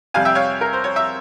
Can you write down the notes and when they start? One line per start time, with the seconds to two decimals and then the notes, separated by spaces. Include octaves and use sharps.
0.14 F2 C3 G3 F5 G#5
0.25 E5 G5
0.35 C#5 F5
0.61 A#4
0.73 C5
0.84 C#5
0.96 E5